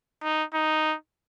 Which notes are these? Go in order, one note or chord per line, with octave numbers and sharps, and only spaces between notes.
D#4
D#4